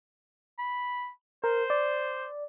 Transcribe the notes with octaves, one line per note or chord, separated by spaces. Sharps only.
B5
A#4 C5
D5